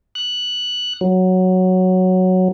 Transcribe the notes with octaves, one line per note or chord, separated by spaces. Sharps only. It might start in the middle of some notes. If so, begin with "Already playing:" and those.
F#6
F#3